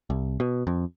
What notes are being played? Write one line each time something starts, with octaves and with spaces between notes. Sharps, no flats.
C2
B2
F2